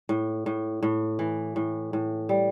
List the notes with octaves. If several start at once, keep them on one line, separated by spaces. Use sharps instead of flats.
A2
A2
A2
E3
A2
A2
G3